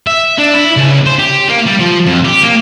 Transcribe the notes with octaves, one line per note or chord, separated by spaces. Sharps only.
E5
D4
E4
C#2
C5
G4
A#3
G3
F3
F2
G4
A#3